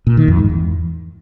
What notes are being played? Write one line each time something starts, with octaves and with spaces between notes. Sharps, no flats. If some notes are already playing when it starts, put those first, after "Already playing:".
A#2
D#3
F2
G#2
E2